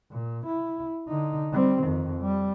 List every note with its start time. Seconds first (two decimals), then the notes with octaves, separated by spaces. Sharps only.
0.11 A#2
0.46 E4
1.09 D3 D#4
1.53 G3 C4
1.83 F2 D#3
2.21 G3